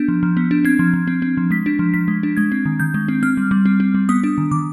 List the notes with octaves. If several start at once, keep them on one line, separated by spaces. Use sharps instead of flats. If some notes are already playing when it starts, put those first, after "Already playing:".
Already playing: B3 D4 G6
F3
F3
B3
D4
C4 G#6
F3
F3
C4
C4
F3
G#3 B6
D4
F3
F3 B6
G#3
D4
G#3 G#6
C4
D#3
D#3 G6
G#3
C4
C4 F6
G3
G3
C4
C4
G3
B3 D#6
D4
D#3
D#3 D6